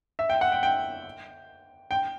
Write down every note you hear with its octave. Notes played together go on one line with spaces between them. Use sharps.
E5
G5
F#5
G5
G5
G5